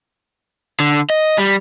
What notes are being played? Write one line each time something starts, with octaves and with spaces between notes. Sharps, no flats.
D3
D#5
G3